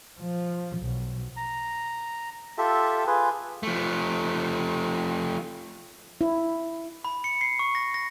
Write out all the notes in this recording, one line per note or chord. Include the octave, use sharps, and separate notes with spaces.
F3
B1
A#5
F4 G4 A4 E5
F4 G#4 B4
F3 A3
E4
B5
C#7
C7
C#6
A#6
A#6